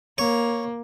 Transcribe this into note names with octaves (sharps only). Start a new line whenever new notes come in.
A#3 C#5